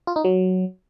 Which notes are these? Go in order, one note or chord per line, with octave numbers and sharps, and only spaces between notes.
F4
D#4
F#3